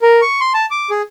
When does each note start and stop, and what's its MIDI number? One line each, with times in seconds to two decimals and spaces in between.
0.02 0.21 70
0.22 0.40 85
0.41 0.53 84
0.54 0.66 81
0.71 0.90 86
0.90 1.02 68